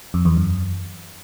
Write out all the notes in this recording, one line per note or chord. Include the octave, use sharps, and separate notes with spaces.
F2
E2
F#2